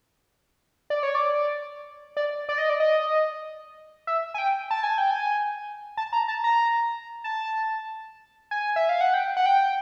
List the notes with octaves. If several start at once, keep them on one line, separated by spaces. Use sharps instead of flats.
D5
C#5
D5
D5
D5
D#5
D5
D#5
E5
G#5
G5
A5
G#5
G5
G#5
A5
A#5
A5
A#5
A5
G#5
E5
F5
F#5
G5
F#5
G5